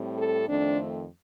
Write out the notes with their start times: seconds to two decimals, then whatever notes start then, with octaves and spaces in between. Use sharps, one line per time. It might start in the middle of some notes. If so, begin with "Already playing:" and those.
Already playing: A2 G3 C4
0.17 A4
0.46 F2 D#3 A3 C4 D4